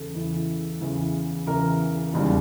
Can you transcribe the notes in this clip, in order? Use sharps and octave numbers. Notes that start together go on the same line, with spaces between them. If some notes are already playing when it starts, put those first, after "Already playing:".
Already playing: E2 C#3 E3 A4
E2 C#3 E3
E2 C#3 E3
E2 C#3 E3 A#4
E1 D#2 C#3 E3 G3